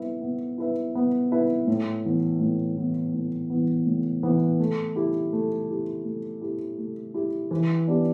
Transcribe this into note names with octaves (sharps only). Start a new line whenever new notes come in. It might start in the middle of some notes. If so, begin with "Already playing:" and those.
Already playing: B3 E4 B4 E5
B3
E4 B4 E5
B3
E4 B4 E5
A2
E3 B3
A2
E3 B3
A2
E3 B3
A2
E3 B3
A3
E4 G4
A3
E4 G4
A3
E4 G4
A3
E4 G4
E3
B3 D4 G4 B4